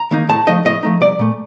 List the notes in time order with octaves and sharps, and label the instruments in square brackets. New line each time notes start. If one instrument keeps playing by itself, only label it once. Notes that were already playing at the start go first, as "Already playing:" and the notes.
Already playing: [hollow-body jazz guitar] A#5
D#3 A#3 D#4
A2 A5
F3 A3 D#4 D#5
A2 D#5
F3 A3 D#4
C2 D5
A#2 A3